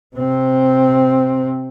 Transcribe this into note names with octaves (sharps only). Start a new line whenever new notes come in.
C3 C4